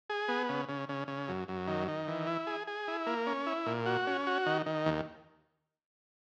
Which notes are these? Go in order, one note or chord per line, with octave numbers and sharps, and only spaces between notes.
G#4
B3
C#3
C#3
C#3
C#3
F#2
F#2
D#3
D#3
E3
E4
G#4
G#4
E4
A#3
C#4
E4
A#2
F#4
C#4
F#4
D#3
D#3
D#2